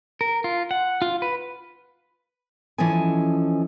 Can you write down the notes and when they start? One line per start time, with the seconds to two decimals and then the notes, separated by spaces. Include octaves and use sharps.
0.21 A#4
0.44 F4
0.71 F#5
1.02 F4
1.22 B4
2.78 E3 F3 C#4 A4 D#5 G#5